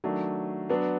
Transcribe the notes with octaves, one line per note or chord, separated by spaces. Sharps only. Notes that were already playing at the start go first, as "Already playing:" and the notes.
D#3 F#3 A3 D4
F#3 B3 D4